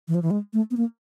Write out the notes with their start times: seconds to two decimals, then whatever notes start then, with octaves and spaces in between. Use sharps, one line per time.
0.08 E3
0.15 F3
0.22 E3
0.31 G#3
0.53 A3
0.71 B3
0.77 A#3